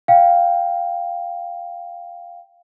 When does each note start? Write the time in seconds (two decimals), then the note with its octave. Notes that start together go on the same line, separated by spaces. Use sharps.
0.08 F5 G5